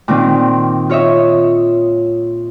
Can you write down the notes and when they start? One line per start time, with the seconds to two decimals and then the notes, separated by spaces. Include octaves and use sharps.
0.08 A#2 D#3 C4
0.90 F4 C#5 D#5 E5